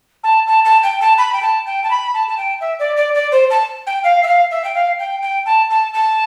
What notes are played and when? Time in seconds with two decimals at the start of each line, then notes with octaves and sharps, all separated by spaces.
0.23 A5
0.47 A5
0.64 A5
0.83 G5
1.00 A5
1.18 B5
1.33 G5
1.42 A5
1.66 G5
1.83 A5
1.90 B5
2.14 A5
2.28 A5
2.37 G5
2.60 E5
2.79 D5
2.96 D5
3.14 D5
3.31 C5
3.50 A5
3.86 G5
4.03 F5
4.23 E5
4.27 F5
4.51 E5
4.64 G5
4.74 F5
4.99 G5
5.22 G5
5.45 A5
5.70 A5
5.93 A5